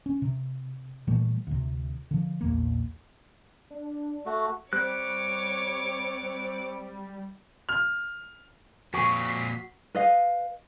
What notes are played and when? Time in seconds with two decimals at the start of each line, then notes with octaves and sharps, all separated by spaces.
0.06 C#4
0.22 C3
1.07 A#2 E3 G3 A3
1.47 D2 C3
2.11 D3 F3
2.41 A#1 E2 A#3
3.71 D4
4.26 A3 F#4
4.73 G3 C4 C#5 D6 F#6
7.69 F6
8.94 F2 A#2 F#4 B6 C7
9.95 B4 D#5 F5